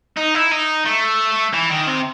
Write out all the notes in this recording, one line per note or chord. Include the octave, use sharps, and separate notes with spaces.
D#4
E4
D#4
A3
E3
D#3
C3